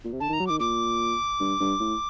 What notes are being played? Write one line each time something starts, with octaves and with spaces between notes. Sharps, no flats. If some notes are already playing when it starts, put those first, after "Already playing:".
A#2
C3
D3 A5
D#3
A#5
F#3
D#3 D6
A#2 D6
G2
G2
A2